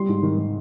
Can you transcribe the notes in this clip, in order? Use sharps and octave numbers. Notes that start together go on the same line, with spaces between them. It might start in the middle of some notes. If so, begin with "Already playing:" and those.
Already playing: G3 C6
G#2
D#3
D#3